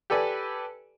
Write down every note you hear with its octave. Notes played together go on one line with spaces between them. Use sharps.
G4 A4 B4 D5 G#5